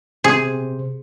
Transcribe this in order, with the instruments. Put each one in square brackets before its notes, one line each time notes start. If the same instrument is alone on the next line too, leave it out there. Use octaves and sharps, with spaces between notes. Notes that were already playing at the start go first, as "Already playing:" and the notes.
[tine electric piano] C3 C5 [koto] G#4